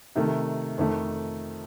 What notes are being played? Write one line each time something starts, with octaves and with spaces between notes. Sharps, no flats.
C3 D#3 A3
F2 D#3 A3